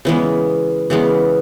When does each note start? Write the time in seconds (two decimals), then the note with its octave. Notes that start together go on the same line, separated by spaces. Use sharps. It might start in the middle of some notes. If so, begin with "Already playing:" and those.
0.05 C#3 E3 G#3 B3
0.90 C#3 E3 G#3 B3